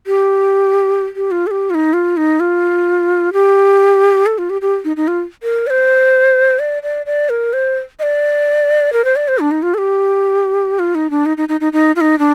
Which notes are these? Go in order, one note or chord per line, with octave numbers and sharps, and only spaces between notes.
G4
G4
F4
A4
G4
F4
D#4
F4
D#4
F4
G4
A4
F4
G4
G4
D#4
D#4
F4
A#4
D5
C5
D5
D5
D5
A#4
C5
D#5
D5
A#4
C5
D5
C5
D4
D#4
F4
A4
G4
F4
D#4
D4
D#4
D#4
D#4
D#4
D#4
F4
D#4
D4